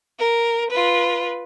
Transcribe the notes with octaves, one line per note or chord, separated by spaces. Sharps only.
A#4
F4 B4